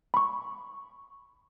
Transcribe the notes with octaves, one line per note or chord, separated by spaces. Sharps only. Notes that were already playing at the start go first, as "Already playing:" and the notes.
B5 C#6